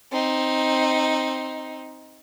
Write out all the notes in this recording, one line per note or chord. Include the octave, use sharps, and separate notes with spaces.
C4 D#4